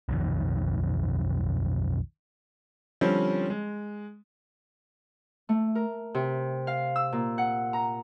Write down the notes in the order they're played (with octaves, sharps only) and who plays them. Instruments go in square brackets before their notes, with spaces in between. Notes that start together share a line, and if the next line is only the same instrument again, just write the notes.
[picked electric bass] B1 F2 D#3
[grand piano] D3 F3 G3 C4 C#4
G#3
[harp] A3
A#4
C3
F5
E6
A#2
F#5
A#5